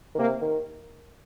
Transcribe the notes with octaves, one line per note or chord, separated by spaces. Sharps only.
D#3
C3 A#3
D#3